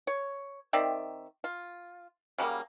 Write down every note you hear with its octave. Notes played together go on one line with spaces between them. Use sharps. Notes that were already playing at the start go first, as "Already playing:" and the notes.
C#5
D#3 C4 D5 E5
F4
C#3 F#3 G3 A#3